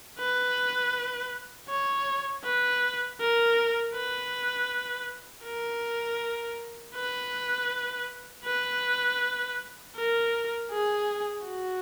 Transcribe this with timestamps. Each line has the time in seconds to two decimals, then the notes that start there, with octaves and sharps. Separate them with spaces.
0.19 B4
1.69 C#5
2.44 B4
3.20 A#4
3.94 B4
5.44 A#4
6.95 B4
8.45 B4
9.95 A#4
10.71 G#4
11.46 F#4